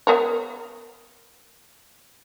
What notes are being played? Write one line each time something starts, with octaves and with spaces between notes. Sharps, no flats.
B3 A#4 C#5